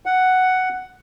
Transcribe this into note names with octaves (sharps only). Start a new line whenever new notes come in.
F#5